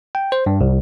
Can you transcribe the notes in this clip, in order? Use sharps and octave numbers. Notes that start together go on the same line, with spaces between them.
G5
C5
G2
C2